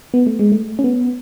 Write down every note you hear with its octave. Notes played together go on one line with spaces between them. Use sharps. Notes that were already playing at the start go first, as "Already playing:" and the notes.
B3
A3
G#3
A3
C#4
B3